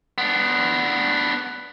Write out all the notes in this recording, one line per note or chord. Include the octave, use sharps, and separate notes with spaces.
B3 D4